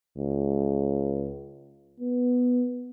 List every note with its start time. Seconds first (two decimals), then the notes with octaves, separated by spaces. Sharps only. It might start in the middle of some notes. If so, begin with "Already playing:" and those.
0.18 C#2
2.00 B3